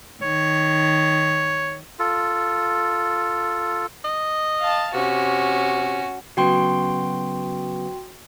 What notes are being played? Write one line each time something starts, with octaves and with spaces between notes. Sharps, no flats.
D#3 C#5
F4 A4
D#5
F5 A5
C3 C#4 F#4
C#3 F#3 B3 F#4 G5 C6